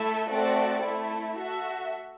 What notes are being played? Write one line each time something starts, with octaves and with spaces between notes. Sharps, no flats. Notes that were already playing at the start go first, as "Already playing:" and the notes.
Already playing: A3 E4 A4 E5
A3 C4 F#4 A4 D5
A3 E4 A4
F#4 A4 E5